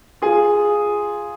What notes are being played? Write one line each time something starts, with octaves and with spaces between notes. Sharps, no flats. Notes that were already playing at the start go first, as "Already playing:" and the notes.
F4 G#4